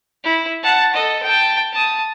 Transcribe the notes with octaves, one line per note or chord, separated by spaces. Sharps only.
E4
F#5 A5
A4 D#5
G5 A5
A5 D#6